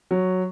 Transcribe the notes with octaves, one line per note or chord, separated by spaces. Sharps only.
F#3